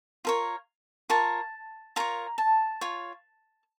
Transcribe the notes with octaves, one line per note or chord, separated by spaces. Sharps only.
F4 A#4 C#5
F4 A#4 C#5 A5
F4 A#4 C#5 A#5
A5
F4 C#5